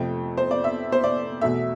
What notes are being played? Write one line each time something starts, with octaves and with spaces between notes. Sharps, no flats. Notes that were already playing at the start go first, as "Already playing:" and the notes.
Already playing: F2 C3 F3 A3 G5
C5
D5
E5
C5
D5
E2 B2 A3 E5